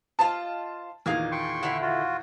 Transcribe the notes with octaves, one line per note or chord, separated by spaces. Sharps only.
F4 C5 D#5 A5
E2 A#2 D#3 A#3 G#4 F5
G5 C6 C#6
D3 E4 E5
F4 F#4